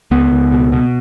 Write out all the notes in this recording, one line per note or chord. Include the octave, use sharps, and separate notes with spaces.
C#2 B3
C#2
B2
B2